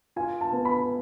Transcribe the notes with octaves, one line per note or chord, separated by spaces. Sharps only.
F4 G#5
A5
B3
B5